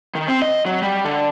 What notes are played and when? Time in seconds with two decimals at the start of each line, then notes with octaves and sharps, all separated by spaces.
0.15 D#3
0.28 C4
0.42 D#5
0.66 F#3
0.82 G3
1.05 D3